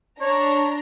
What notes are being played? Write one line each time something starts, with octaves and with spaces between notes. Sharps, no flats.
D4 C#5 A#5